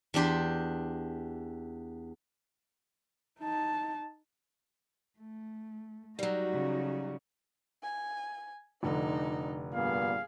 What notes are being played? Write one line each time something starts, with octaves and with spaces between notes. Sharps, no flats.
E2 D4 G4 C6
D#4 A5
A3
F#3 G3 D#4 F#4
C#3
G#5
F1 D3 D4 D#4
G2 A#2 B3 G#4 F5